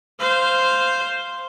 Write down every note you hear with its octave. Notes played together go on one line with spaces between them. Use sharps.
C5 F5